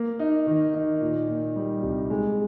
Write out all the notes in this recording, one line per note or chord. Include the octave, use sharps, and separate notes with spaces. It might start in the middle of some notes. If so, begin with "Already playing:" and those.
Already playing: A#3
D#4
D#3
D#4
A#2
A#2
G3
C2
G#3